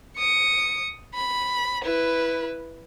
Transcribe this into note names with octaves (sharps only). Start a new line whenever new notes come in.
D#6 C#7
B5
E4 B4